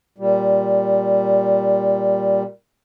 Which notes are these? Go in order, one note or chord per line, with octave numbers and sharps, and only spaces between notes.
A#2 G3